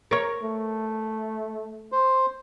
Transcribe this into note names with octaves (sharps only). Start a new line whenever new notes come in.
A#4 C#5
A3
C5